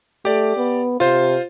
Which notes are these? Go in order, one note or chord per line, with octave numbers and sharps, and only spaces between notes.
A3 G4 D5
B3
C3 F4 C5